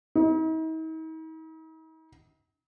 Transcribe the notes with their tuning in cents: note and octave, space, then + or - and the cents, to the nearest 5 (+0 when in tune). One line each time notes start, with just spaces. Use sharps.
D#4 +45